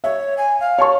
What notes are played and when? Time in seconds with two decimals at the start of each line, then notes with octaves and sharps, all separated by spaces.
0.04 C#5 E5
0.37 G#5
0.60 F5
0.78 C#5 A5 C#6